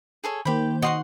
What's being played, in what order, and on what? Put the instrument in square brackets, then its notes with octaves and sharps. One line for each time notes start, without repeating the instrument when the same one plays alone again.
[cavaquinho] G#4 A4 C#5
[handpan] D#3 [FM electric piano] A#3 C5 G6 [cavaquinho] G4 B5
[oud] F#4 D#5 [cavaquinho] F#5 C6 C#6